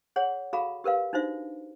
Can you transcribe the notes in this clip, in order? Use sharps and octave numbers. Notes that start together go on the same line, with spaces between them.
G#4 C#5 F#5
F#4 G#4 A4 F5 A#5 B5
G4 A#4 B4 F5
D4 D#4 F#4 C5 E5